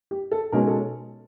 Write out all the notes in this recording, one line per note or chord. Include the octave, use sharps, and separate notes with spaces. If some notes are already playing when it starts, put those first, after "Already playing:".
G4
A4
B1 B2 G#3 C#4 A#4
A4